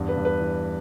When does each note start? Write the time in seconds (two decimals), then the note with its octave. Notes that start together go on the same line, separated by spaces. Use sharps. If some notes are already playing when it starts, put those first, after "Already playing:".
Already playing: E2 G2
0.09 B4
0.17 G2
0.25 B4
0.41 E3